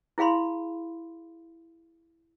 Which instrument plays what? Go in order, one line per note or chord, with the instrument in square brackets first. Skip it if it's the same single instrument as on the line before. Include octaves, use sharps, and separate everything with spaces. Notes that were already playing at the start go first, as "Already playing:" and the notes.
[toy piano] E4 G#4 F5 B5 C6